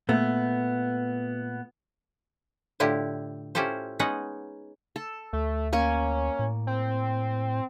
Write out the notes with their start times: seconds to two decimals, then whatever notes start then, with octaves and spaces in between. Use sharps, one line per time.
0.09 A#2 A3 B3
2.80 A2 D3 E4 F4 G4
3.55 C#4 E4 F4 G4 A4 C5
3.99 G#3 B3 C#4 D#4 G#4 F#5
4.96 A4
5.33 D2 A3
5.73 A#3 C#4 G#5 C#6
6.39 A2
6.67 C4